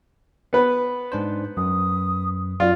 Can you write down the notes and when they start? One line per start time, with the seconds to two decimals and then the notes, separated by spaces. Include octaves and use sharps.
0.53 B3 B4
1.12 G#2 D4 C5
1.57 F#2 D#6
2.60 F#2 F#3 F4 D5